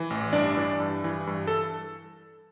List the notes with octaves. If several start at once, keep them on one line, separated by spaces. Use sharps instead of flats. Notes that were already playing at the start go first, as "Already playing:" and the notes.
Already playing: E3
A1
G2 D4 D5
E3
G2
E3
G2
A4